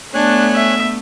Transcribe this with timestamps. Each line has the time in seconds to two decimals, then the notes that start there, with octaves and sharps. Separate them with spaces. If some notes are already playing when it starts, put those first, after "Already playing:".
0.14 A3 B3 D4 C#5 G#5 F#6
0.56 E5